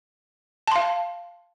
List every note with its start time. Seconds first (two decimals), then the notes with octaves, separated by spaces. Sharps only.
0.67 A5
0.72 C6
0.76 F5